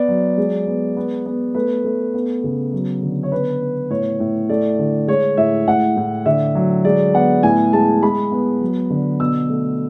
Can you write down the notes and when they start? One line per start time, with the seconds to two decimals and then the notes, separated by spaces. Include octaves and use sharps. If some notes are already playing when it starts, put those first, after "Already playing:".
Already playing: B3 D5
0.08 F#3
0.38 G#3
0.67 B3
0.97 B3
1.26 B3
1.55 A3 B4
1.84 A3
2.14 B3
2.44 C#3
2.73 F#3
3.02 D3
3.23 C#5
3.32 B3 B4
3.61 B3
3.90 A2 C#5
4.20 A2
4.49 A3 D5
4.79 D3
5.08 G#3 C#5
5.37 A2 E5
5.67 A2 F#5
5.97 A2
6.26 D3 E5
6.55 F#3
6.85 G#3 D5
7.14 B3 F#5
7.43 A2 G#5
7.73 G#3 A5
8.02 G#3 B5
8.32 B3
8.61 F#3
8.90 D3
9.20 B2 E6
9.50 A3